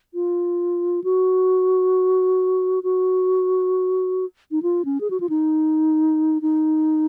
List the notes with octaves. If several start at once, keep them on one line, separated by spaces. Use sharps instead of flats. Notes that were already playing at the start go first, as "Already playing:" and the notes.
F4
F#4
F#4
D#4
F4
C#4
G#4
F#4
F4
D#4
D#4